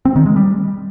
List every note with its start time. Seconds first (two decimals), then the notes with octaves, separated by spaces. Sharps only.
0.05 C4
0.16 D#3
0.26 G#3
0.36 G3